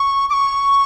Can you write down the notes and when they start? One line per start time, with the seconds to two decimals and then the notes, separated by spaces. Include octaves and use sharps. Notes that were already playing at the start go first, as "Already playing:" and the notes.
Already playing: C#6
0.30 D6
0.33 C#6